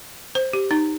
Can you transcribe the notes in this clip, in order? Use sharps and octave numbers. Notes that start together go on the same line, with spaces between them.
C5
G4
D#4